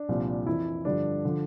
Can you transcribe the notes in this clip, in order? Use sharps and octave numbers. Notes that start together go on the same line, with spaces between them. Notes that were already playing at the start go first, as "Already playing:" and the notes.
Already playing: D4
C2 A#2 F3
F2 E3 E4
G2 D3 F3 D4
D3 F3